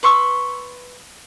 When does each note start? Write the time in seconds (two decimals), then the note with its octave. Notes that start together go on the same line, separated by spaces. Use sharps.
0.03 B4 C6 C#6 E6